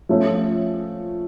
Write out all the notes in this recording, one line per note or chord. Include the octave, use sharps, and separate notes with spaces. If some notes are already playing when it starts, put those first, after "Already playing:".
F3 A3 C#4